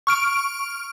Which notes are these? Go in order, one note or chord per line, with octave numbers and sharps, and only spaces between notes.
C#6 F6 D7